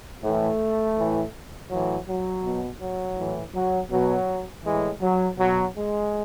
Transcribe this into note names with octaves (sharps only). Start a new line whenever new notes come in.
A2 E3 A3
A2 E3
A2 E3 F#3
F#3
B2
F#3
A2 E3
F#3
B2 F#3
A2 E3 G#3
F#3
B2 F#3
G#3